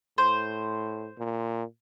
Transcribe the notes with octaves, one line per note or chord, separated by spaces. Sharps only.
A2 C5
A#2